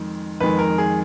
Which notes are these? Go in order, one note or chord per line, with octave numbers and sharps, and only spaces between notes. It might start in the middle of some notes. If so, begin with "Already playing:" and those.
Already playing: F2 D#3 G#3
F2 D#3 G#3 B4
A#4
G#4